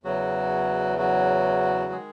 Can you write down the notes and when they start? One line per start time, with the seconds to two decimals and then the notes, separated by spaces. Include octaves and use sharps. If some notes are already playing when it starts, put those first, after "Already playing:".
0.04 E2 C#3 E3 F#3 F#4
0.98 F#3 F#4
1.92 D#3 G#3 G#4